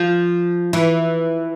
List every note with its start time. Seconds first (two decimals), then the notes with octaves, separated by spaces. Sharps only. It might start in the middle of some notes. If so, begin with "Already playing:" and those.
Already playing: F3
0.73 E3